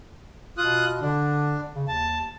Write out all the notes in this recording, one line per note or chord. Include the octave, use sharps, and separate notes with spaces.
B2 F4 D#6 F#6
D3 D4
C#3
D#2 A5